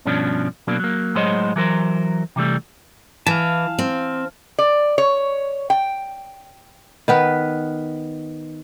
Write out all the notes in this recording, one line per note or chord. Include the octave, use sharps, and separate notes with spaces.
G2 B2 F3 C#4 D4
B2 F#3 A#3 D4
F#3 A#3
A2 F#3 G#3 C5 C#5 D#5
E3 F#3 A#4 C5
C3 E3 G3 A3
E3 F5 A5
C4
D5
C#5
G5
D#3 B3 B4